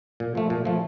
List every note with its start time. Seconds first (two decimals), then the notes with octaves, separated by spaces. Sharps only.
0.20 A#2
0.35 F3 A3
0.50 A#2
0.65 F3 A3